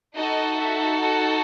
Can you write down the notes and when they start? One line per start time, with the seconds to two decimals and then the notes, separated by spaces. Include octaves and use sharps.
0.15 D#4 F#4 A4 D#5
0.59 E5
1.01 F#5